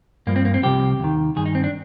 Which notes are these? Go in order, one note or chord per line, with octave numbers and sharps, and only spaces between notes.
G2 F3 A#3
C4
A#3
C4
C2 C3 F3 G4
D#2 D#3
G2 D#3 G#4
D#4
C4
D4